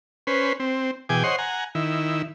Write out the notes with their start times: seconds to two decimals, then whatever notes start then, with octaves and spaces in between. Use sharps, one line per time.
0.27 C#4 B4 C5
0.60 C4
1.09 B2 E3 G#4 G5 G#5 D6
1.24 C5 C#5 D#5 F#5 C6
1.38 F#5 G#5 A#5
1.75 D#3 E4